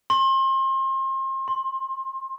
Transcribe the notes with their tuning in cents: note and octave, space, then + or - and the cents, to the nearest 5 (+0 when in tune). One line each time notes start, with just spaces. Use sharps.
C6 +35
C6 +15